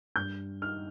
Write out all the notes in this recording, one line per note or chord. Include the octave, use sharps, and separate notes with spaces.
G2 G6
D#4 F6